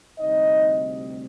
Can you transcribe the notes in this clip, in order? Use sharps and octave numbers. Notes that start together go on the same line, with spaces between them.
D2 C3 G3 C4 D#4 D#5